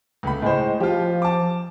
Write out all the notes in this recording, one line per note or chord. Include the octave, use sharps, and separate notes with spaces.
C#2 A3 B5
A2 G#3 C5
F3 F4 G4
A5 D6